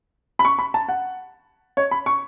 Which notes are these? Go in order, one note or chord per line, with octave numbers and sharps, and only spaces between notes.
B5
C#6
B5
A5
F#5
C#5
B5
C#6